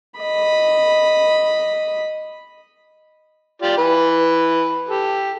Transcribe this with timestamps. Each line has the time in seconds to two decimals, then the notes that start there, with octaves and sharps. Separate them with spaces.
0.18 D#5 B5
3.62 F4 G4 D5
3.78 E3 B4
4.89 G4 A4